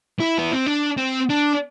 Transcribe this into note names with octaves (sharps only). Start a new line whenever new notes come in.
E4
B3
C4
D4
C4
D4